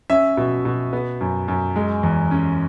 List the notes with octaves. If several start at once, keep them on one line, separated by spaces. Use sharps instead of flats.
C#4 E5
B2
B2
B3
F#2
F#2
G#3
E2
C#4